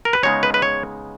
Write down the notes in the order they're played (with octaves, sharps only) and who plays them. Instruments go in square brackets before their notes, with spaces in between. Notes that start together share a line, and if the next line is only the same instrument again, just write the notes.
[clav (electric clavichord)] A#4
B4
C#3 G#3 B3 D#4 C#5
B4
B4
C#5